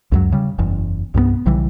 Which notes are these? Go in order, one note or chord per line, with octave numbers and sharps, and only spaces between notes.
C#2 F#2 F#3
C#3 G3
F#1 E2
C2 G2 G3 B3
B1 C#3 E3 G3